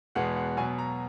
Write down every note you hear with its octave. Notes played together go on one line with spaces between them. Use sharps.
E2 B2 G#3 B3 F#5
F#5
B2 F#3 B3 G#5
A#5